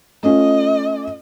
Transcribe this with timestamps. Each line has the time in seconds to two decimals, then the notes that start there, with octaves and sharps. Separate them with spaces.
0.23 A3 C#4 F4 D#5